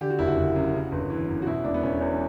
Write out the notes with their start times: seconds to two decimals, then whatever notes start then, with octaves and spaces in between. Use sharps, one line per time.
0.01 D3 G4
0.10 F#4
0.19 F#1 E4
0.27 F#4
0.37 F#1
0.56 F#2
0.74 C#3
0.92 G1
1.10 E3
1.28 F#2
1.42 F#4
1.46 B2 E4
1.64 E1 D4
1.74 B3
1.83 E1 C#4
2.00 E2 C#4